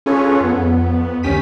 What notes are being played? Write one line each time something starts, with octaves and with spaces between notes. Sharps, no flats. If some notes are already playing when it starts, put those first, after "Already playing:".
C#4 F4 G#4 A4 B4 C#5
F2 B3
D2 D#3 C#4 G4 B6 D#7